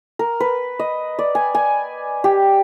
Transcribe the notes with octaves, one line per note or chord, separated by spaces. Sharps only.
A#4
B4
D#5
D5
G#5
G#5
G4